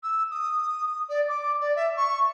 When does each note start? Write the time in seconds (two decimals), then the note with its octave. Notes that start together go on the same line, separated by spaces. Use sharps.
0.03 E6
0.31 D#6
1.09 D5
1.28 D6
1.60 D5
1.76 E5
1.96 C#6